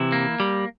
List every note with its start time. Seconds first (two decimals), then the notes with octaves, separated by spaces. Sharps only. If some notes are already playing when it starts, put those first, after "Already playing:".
Already playing: C3 E3 E4
0.12 A#3
0.40 G3